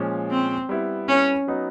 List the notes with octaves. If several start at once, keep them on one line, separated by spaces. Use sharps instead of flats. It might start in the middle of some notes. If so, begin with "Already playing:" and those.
Already playing: A#2 F3 G#3 C#4
C4
G3 B3 E4
C#4
F#3 B3 D#4